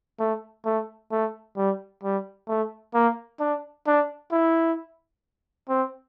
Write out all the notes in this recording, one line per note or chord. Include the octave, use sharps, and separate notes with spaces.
A3
A3
A3
G3
G3
A3
A#3
D4
D4
E4
C4